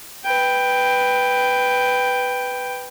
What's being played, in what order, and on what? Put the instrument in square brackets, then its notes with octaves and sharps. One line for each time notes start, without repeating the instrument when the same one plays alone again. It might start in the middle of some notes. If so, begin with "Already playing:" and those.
[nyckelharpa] B4 G5